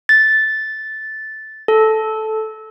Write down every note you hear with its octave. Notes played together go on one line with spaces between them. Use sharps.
A6
A4